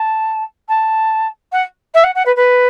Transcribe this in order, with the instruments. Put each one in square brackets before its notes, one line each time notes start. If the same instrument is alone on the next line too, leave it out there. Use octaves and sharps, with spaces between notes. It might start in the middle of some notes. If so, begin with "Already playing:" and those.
Already playing: [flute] A5
A5
F#5
E5
F#5
F#5
B4
B4